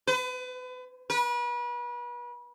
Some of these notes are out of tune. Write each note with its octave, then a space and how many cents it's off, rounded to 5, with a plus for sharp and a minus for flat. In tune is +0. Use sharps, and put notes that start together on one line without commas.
B4 +35
B4 -35